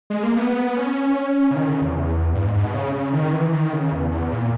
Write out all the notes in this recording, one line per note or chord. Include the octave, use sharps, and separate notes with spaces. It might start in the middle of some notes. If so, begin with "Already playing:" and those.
G#3
A#3
B3
B3
C#4
C#3
D#3
C#3
E2
G2
G#2
G#2
B2
C#3
D#3
E3
D#3
C#3
E2
E2
A#2